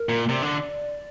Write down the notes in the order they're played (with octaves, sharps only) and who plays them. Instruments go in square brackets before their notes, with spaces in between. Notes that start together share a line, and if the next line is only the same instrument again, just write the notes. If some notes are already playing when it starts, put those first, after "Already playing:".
Already playing: [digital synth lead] A#4
[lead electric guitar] A#2
[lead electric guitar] C3 [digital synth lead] D5
[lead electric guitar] D3